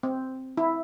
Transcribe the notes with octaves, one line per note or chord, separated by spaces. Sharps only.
C4
E4